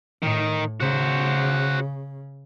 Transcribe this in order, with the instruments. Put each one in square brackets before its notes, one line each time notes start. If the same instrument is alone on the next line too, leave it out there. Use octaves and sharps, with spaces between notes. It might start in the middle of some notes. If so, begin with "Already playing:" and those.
[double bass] A2 [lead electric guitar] D#3 D#4
[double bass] C#3 [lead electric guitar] F#4 C5